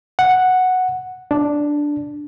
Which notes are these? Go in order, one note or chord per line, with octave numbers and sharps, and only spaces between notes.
F#5
D4